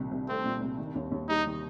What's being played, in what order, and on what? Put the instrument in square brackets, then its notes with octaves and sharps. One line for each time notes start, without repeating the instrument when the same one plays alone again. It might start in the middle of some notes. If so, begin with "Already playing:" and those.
Already playing: [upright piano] C2 A#2 D#3
C2
[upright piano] A3 [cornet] C4
[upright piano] A#2
C2
D#3
D#2
D#2
[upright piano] G3 [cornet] D#4
[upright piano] D#3